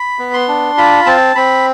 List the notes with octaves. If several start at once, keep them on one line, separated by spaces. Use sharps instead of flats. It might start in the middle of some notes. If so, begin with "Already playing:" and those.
Already playing: B5
B3
C6
D4
F4 B5
C4 A5
C4 B5